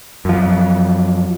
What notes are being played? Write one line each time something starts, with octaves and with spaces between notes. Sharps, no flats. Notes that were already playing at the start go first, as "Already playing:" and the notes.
F#2 F3